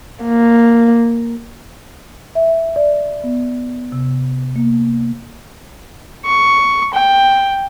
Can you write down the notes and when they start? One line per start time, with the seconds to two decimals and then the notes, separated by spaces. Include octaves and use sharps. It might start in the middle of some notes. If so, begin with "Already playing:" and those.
0.24 A#3
2.35 E5
2.76 D5
3.24 B3
3.92 C3
4.56 A#3
6.26 C#6
6.94 G5